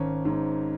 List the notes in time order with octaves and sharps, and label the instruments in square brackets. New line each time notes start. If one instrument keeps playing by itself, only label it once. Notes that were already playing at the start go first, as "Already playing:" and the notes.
Already playing: [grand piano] G#1 C#4
G#2